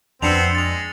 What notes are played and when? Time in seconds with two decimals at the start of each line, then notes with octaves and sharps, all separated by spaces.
0.22 F2 B3 C4 D4 C5 E6 C#7 F7
0.55 G#3 A6 F7